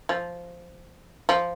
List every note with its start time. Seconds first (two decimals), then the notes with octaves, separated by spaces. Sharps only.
0.09 F3
1.29 F3